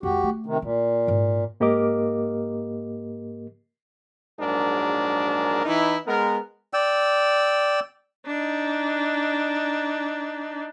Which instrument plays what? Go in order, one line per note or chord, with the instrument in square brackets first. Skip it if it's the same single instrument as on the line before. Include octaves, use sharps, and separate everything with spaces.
[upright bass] F2 G#3 [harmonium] F#4 G4
[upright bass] A3
[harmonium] C3 D#3
[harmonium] A#2 [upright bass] E4
[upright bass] G#2 E4
[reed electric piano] G#2 A#3 G4 A#4 D#5 D6
[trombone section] A#1 G#2 F#3 D4 G#4 A#4
E3 D#4 E4
G#3 B3 A#4
[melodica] D5 G5 E6
[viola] D4 D#4